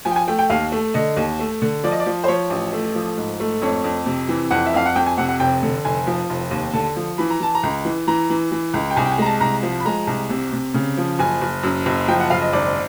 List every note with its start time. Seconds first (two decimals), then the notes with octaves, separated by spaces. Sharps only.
0.05 F3 G#5
0.11 G5
0.16 G#5
0.28 A3 G5
0.39 G5
0.50 D#2 F5
0.72 A3
0.94 D3 D#5
1.17 D#2
1.40 A3
1.62 D3
1.84 F3 D5
1.92 D#5
1.99 D5
2.06 F3
2.24 C5
2.28 F3 C#5
2.50 A1
2.73 A3
2.95 F3
3.17 G#2
3.40 A3
3.62 F2 C#5
3.84 F2
4.06 C3
4.29 E3
4.51 F2 F#5
4.66 E5
4.74 F2 F5
4.85 F#5
4.95 F2 G5
5.06 G#5
5.18 C3 F#5
5.29 F#5
5.40 F1 G5
5.63 D3
5.85 F1 G#5
6.07 F3
6.30 F1
6.51 D#2
6.73 D3 A5
6.96 F3
7.18 E3 B5
7.30 A#5
7.40 E3 A5
7.55 A#5
7.63 C#2
7.85 E3
8.07 E3 A#5
8.30 E3
8.52 E3
8.74 C#2
8.90 G5
8.96 C2 G#5
9.06 G5
9.12 G#5
9.18 G#3 A#5
9.26 A5
9.40 C2 A#5
9.63 F3
9.80 B5
9.86 G#3 A#5
10.07 C2
10.30 C3
10.53 C3
10.74 C#3
10.97 F3
11.19 F#1 G#5
11.41 F#1
11.63 F#2
11.86 F#1
12.08 F3 G5
12.20 F#5
12.30 F#1 F5
12.42 D#5
12.53 G#1 D5